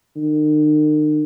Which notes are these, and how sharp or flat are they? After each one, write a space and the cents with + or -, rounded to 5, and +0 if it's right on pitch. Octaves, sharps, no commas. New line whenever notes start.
D#3 -45